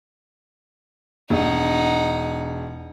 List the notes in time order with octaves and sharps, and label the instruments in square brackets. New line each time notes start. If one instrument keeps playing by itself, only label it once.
[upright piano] E1 [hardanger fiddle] D#4 F#5